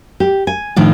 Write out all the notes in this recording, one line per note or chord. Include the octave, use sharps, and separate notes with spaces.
G4
G#5
A2 D#3 F3 D4